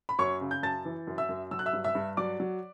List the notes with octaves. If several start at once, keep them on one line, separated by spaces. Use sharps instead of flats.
B5
F#2 C#5 C#6
C#3
G6
F#2 A5 A6
E3
F#2
E5 E6
F#2
F#3 E6
F#6
E5 E6
G2
E5 E6
G2
F#3 D5 D6
F#3